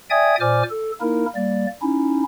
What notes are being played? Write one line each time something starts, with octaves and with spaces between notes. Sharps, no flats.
D5 E5 G5 G#5 D#6 G#6
A#2 C5 D5 G#5 D6 F6
A4
A#3 D#4 E4 A#4
G3 A#3 D5
C#4 D#4 E4